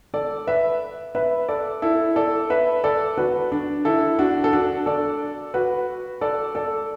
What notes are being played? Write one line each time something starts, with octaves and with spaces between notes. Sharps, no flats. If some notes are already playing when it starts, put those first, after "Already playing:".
A4 D5
B4 E5
B4 E5
A4 D5
E4 A4
A4 D5
B4 E5
A4 D5
F#4 B4
D4
E4 A4
D4 F#4
A4
D4 F#4
A4 D5
F#4 B4
A4 D5
A4 D5